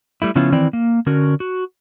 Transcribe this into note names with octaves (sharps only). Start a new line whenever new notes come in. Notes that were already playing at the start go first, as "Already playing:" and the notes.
G3 A3 E4
C#3 F3 B3 C#4 E4 F4
D#3 E3 C4 E4 B4 D5
A#3
D3 C#4 F#4 A#4
F#4